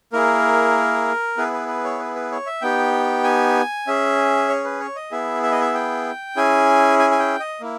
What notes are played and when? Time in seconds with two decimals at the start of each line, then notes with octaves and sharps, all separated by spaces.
0.13 A#3 E4 G#4 A#4
1.37 B3 E4 G#4 B4
1.53 B4
1.68 B4
1.84 C#5
2.00 B4
2.16 B4
2.31 C#5
2.46 E5
2.62 B3 D#4 G4 G5
3.24 G#5
3.87 C#4 G#4 E5
4.49 C#5
4.64 B4
4.80 C#5
4.96 D#5
5.11 B3 E4 G#4 E5
5.43 E5
5.52 D#5
5.61 E5
5.74 G5
6.36 C#4 E4 G#4 G#5
6.99 G#5
7.11 G#5
7.19 G5
7.40 D#5
7.61 A#3 E4